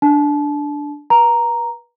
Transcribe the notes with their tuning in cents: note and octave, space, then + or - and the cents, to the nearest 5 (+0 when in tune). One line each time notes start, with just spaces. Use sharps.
D4 +0 A5 -30
B4 -30 A#5 +0